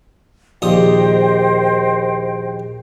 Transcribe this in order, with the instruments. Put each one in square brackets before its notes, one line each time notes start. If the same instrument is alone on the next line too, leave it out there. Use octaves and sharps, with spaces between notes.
[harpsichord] A#1 D#2 D#6 [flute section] C5 D#5 G5